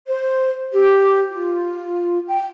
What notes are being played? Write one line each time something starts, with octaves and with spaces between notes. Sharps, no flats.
C5
G4
F4
G5